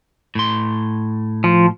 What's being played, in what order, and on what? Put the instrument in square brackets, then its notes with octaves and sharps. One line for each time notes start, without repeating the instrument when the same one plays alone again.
[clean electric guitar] A2 C6
[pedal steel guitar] F3